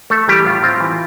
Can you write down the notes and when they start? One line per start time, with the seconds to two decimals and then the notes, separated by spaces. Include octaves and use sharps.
0.10 A3 A4
0.28 E3 G3 G4
0.46 A2 F4
0.63 C4 F4
0.80 E3